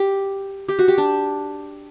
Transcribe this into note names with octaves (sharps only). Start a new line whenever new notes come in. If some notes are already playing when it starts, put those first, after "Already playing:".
Already playing: G4
G4
F#4
G4
D4